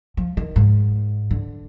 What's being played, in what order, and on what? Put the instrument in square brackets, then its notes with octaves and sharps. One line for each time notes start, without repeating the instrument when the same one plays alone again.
[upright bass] F3
D#3
G#2
D3